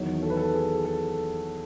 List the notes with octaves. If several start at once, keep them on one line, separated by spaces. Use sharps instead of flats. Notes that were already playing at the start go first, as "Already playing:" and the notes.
Already playing: E2 D#3 F#3 C#5
A4
B4
A4
G#4
A4